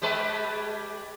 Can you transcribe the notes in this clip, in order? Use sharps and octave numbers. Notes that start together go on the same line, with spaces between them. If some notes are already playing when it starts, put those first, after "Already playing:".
G3 G#3 B4